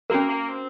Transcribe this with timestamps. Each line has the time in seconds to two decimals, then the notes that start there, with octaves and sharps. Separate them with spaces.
0.10 A#3 C#4 F#4 A#4
0.29 A#3
0.48 C4